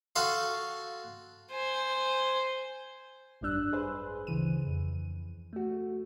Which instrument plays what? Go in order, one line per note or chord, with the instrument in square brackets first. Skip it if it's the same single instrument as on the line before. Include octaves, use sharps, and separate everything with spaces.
[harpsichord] F#4 A4 F5 C6
[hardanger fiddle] C5 G#5
[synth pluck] G#1 F#2 G3 D4 E6 F#6
G#4 B4 C5
D2 C#3 E3 D#7
F2
A3 F#4